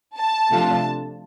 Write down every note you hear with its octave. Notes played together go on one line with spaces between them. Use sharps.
A5
C3 F3 A3 D4 F4